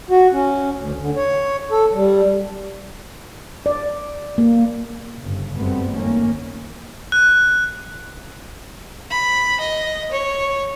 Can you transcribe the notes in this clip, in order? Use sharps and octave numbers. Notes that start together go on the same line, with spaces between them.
F#4
C#4
D2
D3
C#5
A4
G3
D5
A#3
G1 C#3
F#1 G2 G3 A3 B3 C4
D#3 A#3 C#4
F#6
B5
D#5
C#5